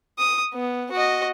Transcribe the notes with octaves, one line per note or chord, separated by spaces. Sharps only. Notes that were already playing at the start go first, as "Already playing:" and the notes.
D#6
B3
F#4 D#5